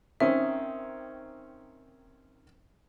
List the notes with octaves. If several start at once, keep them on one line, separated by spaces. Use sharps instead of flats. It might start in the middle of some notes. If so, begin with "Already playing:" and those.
D#3 C4 C#4 E5